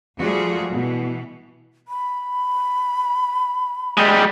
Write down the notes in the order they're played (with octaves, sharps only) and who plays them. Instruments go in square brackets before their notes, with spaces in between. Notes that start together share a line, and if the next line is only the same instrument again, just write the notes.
[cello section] F3 G3 A3 F4 F#4 G#4
B2 E3
[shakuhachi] B5
[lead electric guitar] G3 G#3